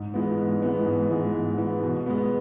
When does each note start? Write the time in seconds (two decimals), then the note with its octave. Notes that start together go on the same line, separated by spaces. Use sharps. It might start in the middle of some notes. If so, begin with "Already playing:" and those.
Already playing: G#2
0.14 E3 G#3 B3
0.38 G#2
0.62 E3 G#3 B3
0.86 G#2
1.10 E3 G#3 B3
1.34 G#2
1.58 E3 G#3 B3
1.83 B2
2.06 G#3 B3